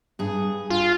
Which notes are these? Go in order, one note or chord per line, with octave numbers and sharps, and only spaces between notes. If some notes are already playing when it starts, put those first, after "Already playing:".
G2 G#4
F4